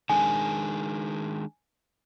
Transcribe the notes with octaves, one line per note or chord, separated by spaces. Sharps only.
D#3 G#3 D4 G#5